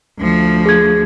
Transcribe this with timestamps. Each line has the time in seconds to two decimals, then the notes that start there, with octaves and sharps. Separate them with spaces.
0.19 D2 F3
0.66 G#4 G#6